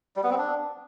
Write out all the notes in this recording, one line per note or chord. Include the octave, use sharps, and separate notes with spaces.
G3
B3
C4
D4